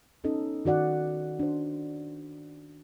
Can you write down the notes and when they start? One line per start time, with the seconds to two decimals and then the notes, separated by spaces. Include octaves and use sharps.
0.24 B3 C#4 D#4 A4 D#5
0.65 D#3 F#4 D5 F#5
1.39 D4 C5